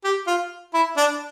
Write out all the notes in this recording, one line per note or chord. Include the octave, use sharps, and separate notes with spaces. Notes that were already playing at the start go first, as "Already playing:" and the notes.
G4
F4
E4
D4